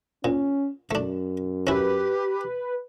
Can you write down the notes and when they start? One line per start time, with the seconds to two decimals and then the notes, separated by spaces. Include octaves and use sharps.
0.24 A#2 C#4
0.91 F#2 A3 D4
1.67 C#4 E4 G4 B4